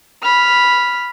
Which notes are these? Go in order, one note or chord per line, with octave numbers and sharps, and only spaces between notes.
B5 F6